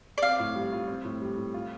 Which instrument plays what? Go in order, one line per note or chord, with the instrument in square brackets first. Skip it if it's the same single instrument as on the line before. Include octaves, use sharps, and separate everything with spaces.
[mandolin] D5
[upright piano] C4 [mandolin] F5
[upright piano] A2
G3
F4
C4
A2
G3
A2
F4